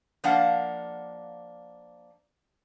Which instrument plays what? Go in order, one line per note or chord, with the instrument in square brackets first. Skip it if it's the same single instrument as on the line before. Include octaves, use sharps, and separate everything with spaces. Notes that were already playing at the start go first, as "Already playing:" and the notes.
[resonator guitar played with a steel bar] F3 A#3 D4 F5 F#5